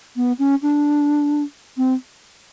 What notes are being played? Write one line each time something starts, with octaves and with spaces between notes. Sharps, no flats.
B3
C#4
D4
C4